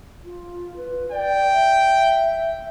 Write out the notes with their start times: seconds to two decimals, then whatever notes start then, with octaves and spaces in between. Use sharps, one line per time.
0.24 F4
0.77 B4
1.11 D5 G5
1.52 E5